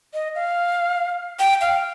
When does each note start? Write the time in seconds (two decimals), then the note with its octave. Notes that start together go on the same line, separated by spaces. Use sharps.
0.14 D#5
0.35 F5
1.39 G5
1.61 F5